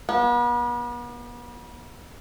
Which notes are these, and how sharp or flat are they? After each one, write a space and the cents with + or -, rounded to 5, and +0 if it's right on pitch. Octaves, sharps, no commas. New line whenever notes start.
B3 -40